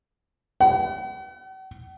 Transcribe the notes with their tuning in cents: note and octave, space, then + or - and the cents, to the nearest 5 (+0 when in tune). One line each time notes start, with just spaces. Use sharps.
F#5 +45